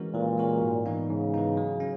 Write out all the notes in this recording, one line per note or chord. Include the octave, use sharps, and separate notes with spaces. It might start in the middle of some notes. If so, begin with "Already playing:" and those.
Already playing: E3 G#3 C#4 F#4 A#4
A#2 E3
G#3 C#4 F#4 A#4
G#2
E3 B3 D#4
G#2 C#3
E3 B3 D#4
F#3
C#4